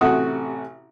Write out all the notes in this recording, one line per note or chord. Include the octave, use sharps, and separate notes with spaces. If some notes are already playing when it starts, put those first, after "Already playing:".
A1 C3 A3 F#4 F#5 D#6